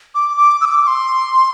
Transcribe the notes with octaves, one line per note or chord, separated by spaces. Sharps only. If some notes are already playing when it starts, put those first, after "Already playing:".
D6
D6
E6
D6
D6
C6